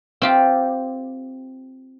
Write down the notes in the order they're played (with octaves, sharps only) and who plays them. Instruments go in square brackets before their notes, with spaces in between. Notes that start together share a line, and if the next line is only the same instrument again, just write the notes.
[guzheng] C4 F4 G4